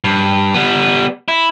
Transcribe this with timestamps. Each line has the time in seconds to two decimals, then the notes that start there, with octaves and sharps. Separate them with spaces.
0.04 G2
0.54 G3 B3
1.28 E4